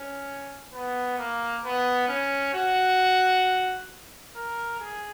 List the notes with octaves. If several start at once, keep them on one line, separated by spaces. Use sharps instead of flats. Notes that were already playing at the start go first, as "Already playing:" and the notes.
Already playing: C#4
B3
A#3
B3
C#4
F#4
A#4
G#4